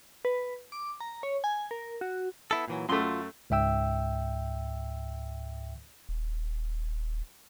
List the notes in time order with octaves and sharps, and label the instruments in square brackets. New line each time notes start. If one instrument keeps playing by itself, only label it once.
[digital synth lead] B4
D6
A#5
C#5
G#5
A#4
F#4
[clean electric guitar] B3 E4 A4
A#2 E3 F#3
[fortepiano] F#2 A3 [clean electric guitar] F4 C6
[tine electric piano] C#2 G#2 E5 G5 E6
[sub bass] D#1